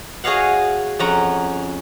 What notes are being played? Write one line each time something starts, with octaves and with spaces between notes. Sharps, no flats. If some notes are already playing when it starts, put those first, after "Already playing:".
F#4 G#4 C#5 D#5 F5 F#5
F2 C#4 F#5 A#5